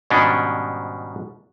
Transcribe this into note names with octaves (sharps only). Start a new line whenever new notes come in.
G#2 B2 D#3 G3 C#4 D4